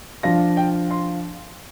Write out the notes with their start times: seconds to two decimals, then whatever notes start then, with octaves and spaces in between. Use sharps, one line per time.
0.23 F3 D4 F4 A#6
0.57 G5
0.91 C6